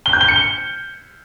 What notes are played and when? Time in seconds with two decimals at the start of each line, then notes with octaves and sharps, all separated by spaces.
0.06 G7
0.13 G6
0.21 G7
0.28 C#7
0.36 G7